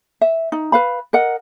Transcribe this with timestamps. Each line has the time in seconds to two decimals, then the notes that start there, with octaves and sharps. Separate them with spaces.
0.21 E5
0.52 D#4
0.72 B4 F5 B5
1.13 A#4 D#5 F#5